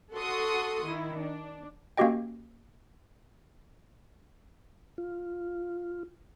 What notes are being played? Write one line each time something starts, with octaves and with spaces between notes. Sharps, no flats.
F#4 A4 F#5 C6 C#6 D#6
D#3 E4
D4
A#3 C#4 F#4 G4 D#5 G5
F4